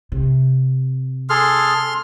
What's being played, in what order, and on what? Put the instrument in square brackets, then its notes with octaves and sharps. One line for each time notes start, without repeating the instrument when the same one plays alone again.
[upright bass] C3
[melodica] G#4 A4 [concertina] C6 F6